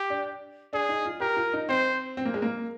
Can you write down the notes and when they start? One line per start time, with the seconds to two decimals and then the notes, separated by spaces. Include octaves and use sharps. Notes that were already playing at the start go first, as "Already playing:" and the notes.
Already playing: G4
0.10 D4
0.73 D4 G#4
0.89 D#4
1.05 F4
1.20 G4 A#4
1.37 F4
1.53 D#4
1.69 C4 C5
2.17 C4
2.25 A#3
2.34 G#3
2.42 A#3